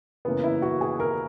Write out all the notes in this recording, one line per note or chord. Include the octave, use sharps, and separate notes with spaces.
F#2 C#3 E3 A#3 B3
E4
F#4
G#4
A#4